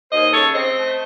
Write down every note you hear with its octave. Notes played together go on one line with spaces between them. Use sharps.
D#2 C5 D#5
C#3 A4 C#5
C4 C5 D#5
A3